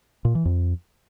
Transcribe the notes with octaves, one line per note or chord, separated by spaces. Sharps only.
A#2
E3
F2